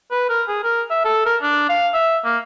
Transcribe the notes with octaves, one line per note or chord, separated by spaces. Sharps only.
B4
A#4
G#4
A#4
E5
A4
A#4
D4
F5
E5
A#3